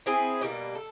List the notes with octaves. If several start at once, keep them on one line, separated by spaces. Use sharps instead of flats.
C4 E4 G#4
B2 G3 A#3
A4